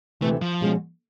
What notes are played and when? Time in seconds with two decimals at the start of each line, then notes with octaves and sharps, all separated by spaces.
0.22 D2 C3 E3 A3
0.42 F3
0.61 B2 G#3 C#4 F#4